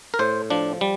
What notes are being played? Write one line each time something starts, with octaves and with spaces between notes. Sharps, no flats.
A#4
A2 C5
F3 D4
G3